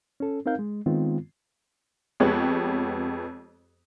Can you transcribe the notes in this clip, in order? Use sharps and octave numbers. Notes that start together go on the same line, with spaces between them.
C#4 A4
C4 D#4 A#4 F5 G6
G#3
D#3 G#3 B3 C4 F4
F2 G#3 B3 G4 C#5 F#6